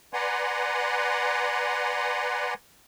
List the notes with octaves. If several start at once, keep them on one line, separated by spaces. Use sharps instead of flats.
B4 D5 F#5 G#5 A#5 C6